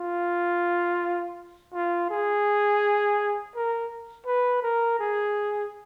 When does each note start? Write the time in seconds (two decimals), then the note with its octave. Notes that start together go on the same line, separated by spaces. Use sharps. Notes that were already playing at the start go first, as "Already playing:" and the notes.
Already playing: F4
1.74 F4
2.10 G#4
3.55 A#4
4.26 B4
4.62 A#4
4.99 G#4